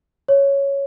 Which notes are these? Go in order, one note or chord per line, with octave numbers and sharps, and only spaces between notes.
C#5